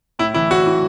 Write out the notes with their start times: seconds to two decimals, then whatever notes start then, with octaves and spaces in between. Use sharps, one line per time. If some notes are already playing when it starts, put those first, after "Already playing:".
0.19 A2 E4
0.34 E3 E4
0.50 A2 F#4
0.66 E3